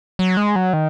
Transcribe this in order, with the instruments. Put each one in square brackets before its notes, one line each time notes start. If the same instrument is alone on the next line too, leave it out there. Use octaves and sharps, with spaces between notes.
[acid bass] F#3
G#3
F#3
D#3